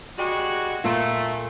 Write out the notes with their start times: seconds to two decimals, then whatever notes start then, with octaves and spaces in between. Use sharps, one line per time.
0.18 G3 G#3 F#4
0.84 A#2 A3 F4